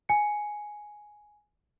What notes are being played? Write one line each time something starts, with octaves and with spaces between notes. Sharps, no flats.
G#5 C#7